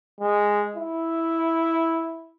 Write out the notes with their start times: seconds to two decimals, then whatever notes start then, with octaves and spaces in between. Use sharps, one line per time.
0.21 G#3
0.76 E4